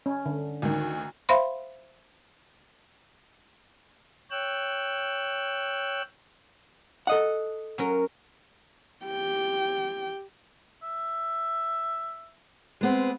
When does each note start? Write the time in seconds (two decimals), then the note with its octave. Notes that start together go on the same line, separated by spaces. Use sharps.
0.06 C#4
0.26 D3
0.62 D2 D#3
1.29 C5 E5 F5 B5 C6
4.31 C#5 G5 E6 F#6
7.07 A4 D#5 F#5
7.78 F#3 C#4 A#4
9.05 G4 G5
10.82 E5
12.81 G#3 B3 C4